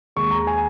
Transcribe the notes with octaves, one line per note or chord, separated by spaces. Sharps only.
D#2 D#3 G#3 C#6
A#5
G#5